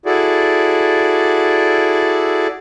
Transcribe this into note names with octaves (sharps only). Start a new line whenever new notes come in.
E4 F#4 G#4 A4 D5